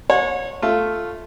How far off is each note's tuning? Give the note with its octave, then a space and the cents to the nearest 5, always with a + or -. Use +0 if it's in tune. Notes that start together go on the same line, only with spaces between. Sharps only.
C#5 -20 F#5 -40
A3 +0 F4 +0